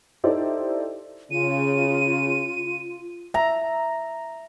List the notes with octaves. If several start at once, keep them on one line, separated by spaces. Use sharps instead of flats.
D#4 E4 G4 A4 C5 D5
C#3 F4 D#7
E5 A#5